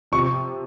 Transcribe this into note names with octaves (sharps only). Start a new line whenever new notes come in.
C3 F3 C#6